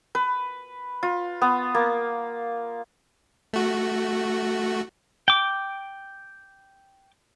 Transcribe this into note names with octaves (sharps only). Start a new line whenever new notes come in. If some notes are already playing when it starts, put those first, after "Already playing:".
B4
F4
B3
A#3
A3 F#4
G5 D6